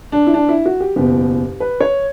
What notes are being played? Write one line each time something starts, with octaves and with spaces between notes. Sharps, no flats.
D4
E4
D4
E4
F#4
G4
F#1 E2 B2 G4
B4
C#5